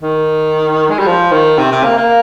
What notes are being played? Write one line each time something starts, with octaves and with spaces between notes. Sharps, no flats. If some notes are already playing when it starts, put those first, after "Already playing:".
D#3
G#3
G3
F3
D#3
C3
C3
A#3
A#3